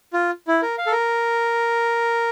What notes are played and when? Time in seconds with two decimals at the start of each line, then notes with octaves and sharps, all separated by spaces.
0.13 F4
0.48 E4
0.62 A#4
0.78 F5
0.86 A4
0.92 A#4